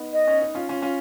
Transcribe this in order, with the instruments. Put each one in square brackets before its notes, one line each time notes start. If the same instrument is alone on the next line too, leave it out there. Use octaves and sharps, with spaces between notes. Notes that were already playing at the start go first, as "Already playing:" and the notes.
Already playing: [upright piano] B3 D#4
[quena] D#5
[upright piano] C#4
D#4
C#4 F4
C#4 F4
C#4 F4